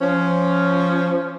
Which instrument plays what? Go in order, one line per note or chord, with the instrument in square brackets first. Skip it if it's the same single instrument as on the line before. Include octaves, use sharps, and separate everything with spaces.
[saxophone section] F3 C#4